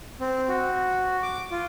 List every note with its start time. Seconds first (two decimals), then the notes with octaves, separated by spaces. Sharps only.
0.20 C4
0.48 F#4
1.23 D6
1.51 F4